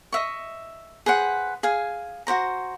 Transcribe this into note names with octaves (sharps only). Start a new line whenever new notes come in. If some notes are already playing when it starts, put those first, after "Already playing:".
D#5 E5 C#6
G#4 B4 C5 F#5
G#4 F5 G#5
F#4 G4 C5 A#5